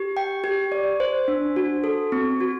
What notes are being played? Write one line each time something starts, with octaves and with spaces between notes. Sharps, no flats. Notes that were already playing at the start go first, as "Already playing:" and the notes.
Already playing: G4
G5
G4
D5
C5
D4
F#4
A4
C4
F#4